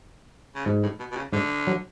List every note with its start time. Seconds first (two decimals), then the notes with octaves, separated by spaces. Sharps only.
0.56 C#3
0.66 G#2 B2
0.83 A2
1.00 B2
1.12 B2
1.17 C#3
1.33 G#2 D3
1.67 F#3